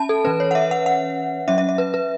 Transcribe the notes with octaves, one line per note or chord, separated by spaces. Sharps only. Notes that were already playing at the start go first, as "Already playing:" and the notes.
Already playing: C#4 E5 A5 B5
A4
E3 C#4 B4
C#5
F#5
E5
F#5
F#5
F#3 C#4 E5
E5
E5
B4
B4